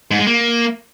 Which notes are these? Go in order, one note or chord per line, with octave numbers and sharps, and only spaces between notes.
G#2
G#3
A#3